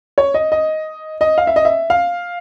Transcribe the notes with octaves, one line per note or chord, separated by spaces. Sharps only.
C#5
D#5
D#5
D#5
F5
E5
D#5
E5
F5